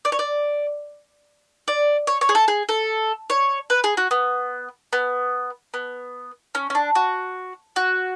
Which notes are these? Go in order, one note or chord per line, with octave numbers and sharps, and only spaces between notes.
D5
C#5
D5
D5
C#5
C#5
G#4
A4
G#4
A4
C#5
B4
G#4
F#4
B3
B3
B3
C#4
C#4
D4
F#4
F#4